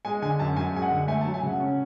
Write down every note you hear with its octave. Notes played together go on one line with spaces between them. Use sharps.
G#3 G#5
D3 G#5
F#2 A5
F#2 G#5
G#3 G#5
F#5
D3
A3 G#5
A5
F#3
G#5
C#3 F#5
C#4